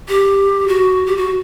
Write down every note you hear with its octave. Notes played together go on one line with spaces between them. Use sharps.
G4
F#4
G4
F#4